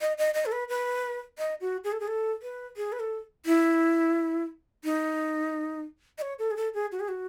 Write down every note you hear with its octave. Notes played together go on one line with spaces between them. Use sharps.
D#5
D#5
D#5
A4
B4
B4
D#5
F#4
G#4
A4
G#4
A4
B4
G#4
B4
A4
E4
D#4
D#5
C#5
A4
G#4
A4
G#4
F#4
G#4
F#4